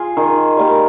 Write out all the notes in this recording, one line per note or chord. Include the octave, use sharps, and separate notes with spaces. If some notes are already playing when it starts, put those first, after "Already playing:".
Already playing: F4 G#4
D#3
G3 A#3